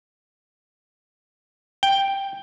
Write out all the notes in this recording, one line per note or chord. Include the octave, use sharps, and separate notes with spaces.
G5